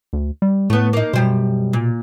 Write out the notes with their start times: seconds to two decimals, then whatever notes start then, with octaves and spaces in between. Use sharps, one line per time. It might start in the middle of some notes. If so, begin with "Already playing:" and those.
0.13 D2
0.42 G3
0.70 A2 A3 B3
0.93 A#3 D#4
1.13 F#2 B2 G3 C5
1.73 A#2